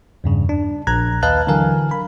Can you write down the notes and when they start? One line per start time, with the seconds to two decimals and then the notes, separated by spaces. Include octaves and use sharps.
0.24 E2 G2 C#3
0.49 D4
0.87 A#1 A#5 F#6 G#6
1.23 D#2 B4 D#5 F5 A5 F#6
1.47 D3 E3 F#3 A#4 F5 G#5
1.91 B5